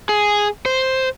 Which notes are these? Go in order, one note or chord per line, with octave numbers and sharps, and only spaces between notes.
G#4
C5